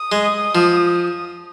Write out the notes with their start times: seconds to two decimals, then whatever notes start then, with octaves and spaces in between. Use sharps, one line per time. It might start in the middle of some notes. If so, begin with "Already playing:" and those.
Already playing: D#6
0.12 G#3
0.55 F3